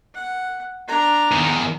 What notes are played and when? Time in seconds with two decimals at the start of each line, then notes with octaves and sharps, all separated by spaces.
0.14 F#5
0.88 D4 A#5
1.32 E2 D#3